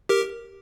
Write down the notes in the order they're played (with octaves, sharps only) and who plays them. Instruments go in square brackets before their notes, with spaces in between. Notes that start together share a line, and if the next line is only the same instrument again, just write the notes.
[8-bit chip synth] G4 A#4